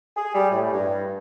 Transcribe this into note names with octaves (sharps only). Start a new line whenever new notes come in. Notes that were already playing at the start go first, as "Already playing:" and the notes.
G#4
G3
A2
G2